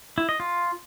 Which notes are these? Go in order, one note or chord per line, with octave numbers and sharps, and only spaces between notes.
E4
D#5
F4